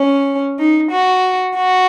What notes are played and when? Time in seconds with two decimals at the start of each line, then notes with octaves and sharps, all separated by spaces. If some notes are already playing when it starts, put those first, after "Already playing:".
Already playing: C#4
0.58 D#4
0.91 F#4
1.56 F#4